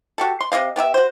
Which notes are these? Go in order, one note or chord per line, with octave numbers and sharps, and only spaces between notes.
F#4 G4 A4
C6
C3 E4 D#5 F5
B3 G4 A#4 E5
F#4 C5